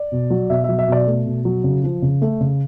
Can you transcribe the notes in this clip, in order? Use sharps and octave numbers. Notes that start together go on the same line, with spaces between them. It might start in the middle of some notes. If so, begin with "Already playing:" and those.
Already playing: D5
B2
F#3
B2 E5
F#3 E5
E5
B2 D5
A3
B2
F#3
C#3
F3
C#3
A3
C#3